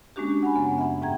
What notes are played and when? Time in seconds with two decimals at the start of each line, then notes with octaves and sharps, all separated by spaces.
0.16 G#3 A#3 C#4 D4 F#4 G4
0.43 F#5 G#5 B5
0.56 F#2 C#3 A#3 B3
0.78 E5 F#5
1.02 G#2 G5 A#5 G#6